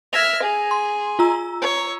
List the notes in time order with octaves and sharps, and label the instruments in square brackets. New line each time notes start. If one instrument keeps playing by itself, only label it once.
[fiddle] E5 F6 [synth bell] G#6 A#6 F7
[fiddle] G#4
[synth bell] C6
F4 A#5 E6
[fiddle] C#5